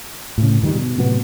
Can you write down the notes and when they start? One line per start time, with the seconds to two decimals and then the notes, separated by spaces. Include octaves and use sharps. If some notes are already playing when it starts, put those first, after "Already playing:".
0.38 A2 C#3
0.62 G2 D#3 G3 G#3
0.75 B2
0.97 A2 C3 F#3 B3